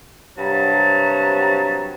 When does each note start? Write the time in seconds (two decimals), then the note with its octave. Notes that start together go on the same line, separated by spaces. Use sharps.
0.37 G2 C3 F#3 F#4 A5 A#5